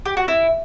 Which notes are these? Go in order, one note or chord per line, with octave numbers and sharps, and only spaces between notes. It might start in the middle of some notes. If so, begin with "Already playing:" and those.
G4
F#4
E4